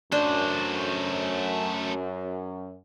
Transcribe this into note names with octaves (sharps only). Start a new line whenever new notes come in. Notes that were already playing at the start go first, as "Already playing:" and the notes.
F#2 A3 D4 C5